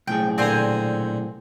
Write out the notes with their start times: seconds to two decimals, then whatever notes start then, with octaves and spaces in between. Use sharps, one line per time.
0.07 B1 A2 G#4 G5
0.38 A#2 D3 C4 C5 G#5 A#5